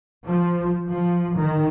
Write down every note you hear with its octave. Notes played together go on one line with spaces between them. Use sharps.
F3
F3
D#3